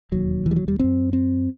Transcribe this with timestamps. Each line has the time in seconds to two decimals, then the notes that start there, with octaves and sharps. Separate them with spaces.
0.12 E1 D#2 F#3
0.46 E3
0.51 G3
0.56 F#3
0.68 G3
0.79 F#1 F#2 C4
1.13 C4